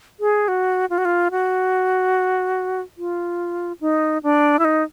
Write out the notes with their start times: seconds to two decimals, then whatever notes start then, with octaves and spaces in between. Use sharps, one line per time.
0.20 G#4
0.48 F#4
0.90 F4
0.98 F#4
1.05 F4
1.31 F#4
2.98 F4
3.81 D#4
4.23 D4
4.59 E4
4.65 D#4